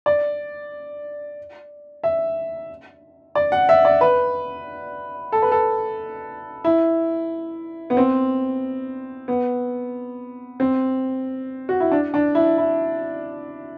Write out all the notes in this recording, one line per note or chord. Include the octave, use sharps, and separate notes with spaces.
D5
E5
D5
F#5
E5
D5
B4
A4
B4
A4
E4
B3
C4
B3
C4
F#4
E4
D4
D4
E4
E4